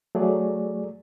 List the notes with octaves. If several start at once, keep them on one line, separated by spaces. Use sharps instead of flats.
F#3 A3 G#4 D5